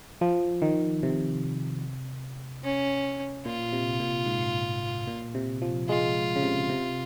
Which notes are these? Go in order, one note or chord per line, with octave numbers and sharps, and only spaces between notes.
F3
D#3
C3
C#4
A#2 F4
C3
A#2
G#2
A#2
C3
F3
G#3 F4
C#3
C3
C3